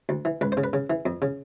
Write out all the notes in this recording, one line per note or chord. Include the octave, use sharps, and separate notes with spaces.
D2
E3
C#2 B4
C5
C#3
B4
C#3
E3
F2
C#3